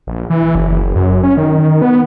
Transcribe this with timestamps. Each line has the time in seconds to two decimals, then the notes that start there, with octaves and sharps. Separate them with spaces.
0.07 A#1
0.30 E3
0.55 F#1
0.96 F#2
1.23 C#4
1.37 D#3
1.82 B3